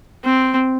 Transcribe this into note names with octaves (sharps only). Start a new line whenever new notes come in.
C4